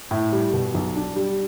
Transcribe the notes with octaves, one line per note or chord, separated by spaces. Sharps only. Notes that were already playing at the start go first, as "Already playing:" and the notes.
A2
G3
B2
B1
D4
G3